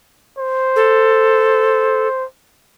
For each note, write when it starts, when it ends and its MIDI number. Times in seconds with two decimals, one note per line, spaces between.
0.38 2.25 72
0.76 2.08 69